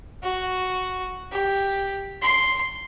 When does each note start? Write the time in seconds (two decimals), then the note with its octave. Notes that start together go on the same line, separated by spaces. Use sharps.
0.22 F#4
1.32 G4
2.22 C6